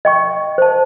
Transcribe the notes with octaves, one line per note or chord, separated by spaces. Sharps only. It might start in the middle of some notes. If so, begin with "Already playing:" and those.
D#5 G5 C#6
C5 A5